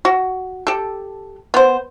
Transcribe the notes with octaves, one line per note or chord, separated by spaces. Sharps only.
F#4
G4 A4
B3 C5